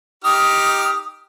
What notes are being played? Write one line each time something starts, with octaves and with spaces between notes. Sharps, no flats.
D#4 G4 D#6 F6